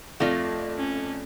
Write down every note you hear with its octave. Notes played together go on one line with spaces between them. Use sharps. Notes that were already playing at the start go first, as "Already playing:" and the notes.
F2 A3 F4 D5 A#6
C#4